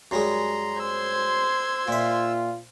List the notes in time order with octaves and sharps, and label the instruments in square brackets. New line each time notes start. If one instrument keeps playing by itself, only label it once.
[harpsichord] F#2 G3 G#3 [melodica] A#5 C6
[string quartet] C5 C6 G#6 [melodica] E6
[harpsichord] A#2 E5 [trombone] F4